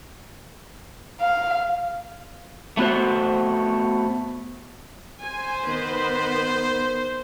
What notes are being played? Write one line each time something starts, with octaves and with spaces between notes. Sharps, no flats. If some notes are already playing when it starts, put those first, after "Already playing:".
F5
A3 B3 F#4 C5
C5 G#5
D#3 B3 B4